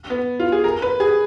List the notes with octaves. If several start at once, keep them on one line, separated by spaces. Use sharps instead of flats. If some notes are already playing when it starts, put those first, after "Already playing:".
B3
F4
G#4
A#4
B4
G#4